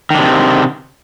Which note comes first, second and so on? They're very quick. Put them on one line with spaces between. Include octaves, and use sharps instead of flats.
D#3 D4 C3